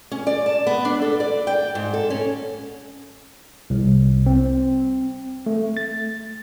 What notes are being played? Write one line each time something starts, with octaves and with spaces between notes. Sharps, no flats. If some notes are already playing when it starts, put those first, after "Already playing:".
C#4
D5
A5
B3
D4
A4
D5
G5
G#2
A4
C#4
C2
C4
A3
A6